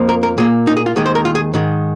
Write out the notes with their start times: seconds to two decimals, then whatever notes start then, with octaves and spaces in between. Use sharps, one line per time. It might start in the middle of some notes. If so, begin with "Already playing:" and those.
Already playing: F2 F3 A#3
0.09 A#4
0.23 A#4
0.38 A#2 A#3 G#4
0.67 D#4
0.77 G#4
0.86 F4
0.96 D#2 D#3 G#3 G#4
1.06 C5
1.15 A#4
1.25 F4
1.35 G#4
1.54 G#2 D#3 G#3